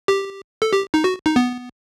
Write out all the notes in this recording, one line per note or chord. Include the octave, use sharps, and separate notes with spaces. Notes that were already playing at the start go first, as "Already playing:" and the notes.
G4
A4
G4
D#4
F#4
D#4
B3